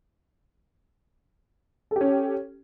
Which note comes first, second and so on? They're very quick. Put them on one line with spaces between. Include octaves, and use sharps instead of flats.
A4 G4 C#4